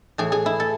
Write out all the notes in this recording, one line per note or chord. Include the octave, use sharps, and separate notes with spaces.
A2 E3 G#4
G#4
E4
A4